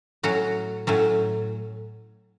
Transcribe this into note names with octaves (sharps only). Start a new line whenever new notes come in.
A2 F#3 C#4 F#4
A2 F#3 C#4